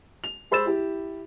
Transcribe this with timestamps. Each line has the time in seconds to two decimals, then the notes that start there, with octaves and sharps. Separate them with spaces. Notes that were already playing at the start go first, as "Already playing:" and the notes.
0.24 F7
0.51 G#4 C5 B5 E6 A6 E7
0.65 E4 G4